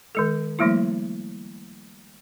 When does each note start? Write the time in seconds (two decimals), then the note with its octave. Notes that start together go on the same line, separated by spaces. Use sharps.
0.15 D#3 G#3 A4
0.59 F3 G3 A3 A#3 E4